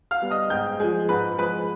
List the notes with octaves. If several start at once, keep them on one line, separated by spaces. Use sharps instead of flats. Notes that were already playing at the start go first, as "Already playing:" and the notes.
F5 F6
G3 B3
D#5 D#6
G#2 G5 G6
F3 G#3 G#4 G#5
G#2 B4 B5
F3 G#3 B4 B5